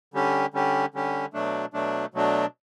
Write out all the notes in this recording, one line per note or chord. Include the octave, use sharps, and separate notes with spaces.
D3 G3 C#4 G4
D3 G3 C#4 G4
D3 G3 C#4 G4
B2 F#3 A3 D4
B2 F#3 A3 D4
B2 F#3 A3 D4